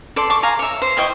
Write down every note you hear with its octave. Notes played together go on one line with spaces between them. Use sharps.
A4 D5 C6
A4 A5 C#6 D6
F5 G#5 A#5
C#5 E5
C5
E4 D#5 G5 C#6